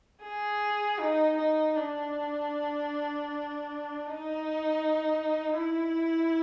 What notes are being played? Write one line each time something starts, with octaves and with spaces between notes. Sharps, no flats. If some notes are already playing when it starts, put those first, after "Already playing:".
G#4
D#4
D#4
D4
D#4
E4